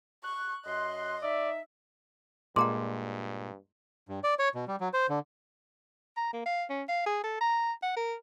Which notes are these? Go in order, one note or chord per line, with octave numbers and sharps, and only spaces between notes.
C#6 F#6
F#2 D#5 C6
D#4 D5 E5
G2 A#2 G#3 F#5 A#5 C6 D6
G2
D5
C#5
B2
G3
F#3
C5
D3
A#5
A#3
F5
C#4
F5
G#4
A4
A#5
F#5
A#4